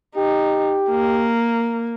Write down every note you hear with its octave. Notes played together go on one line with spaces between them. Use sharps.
D#4 G4
A#3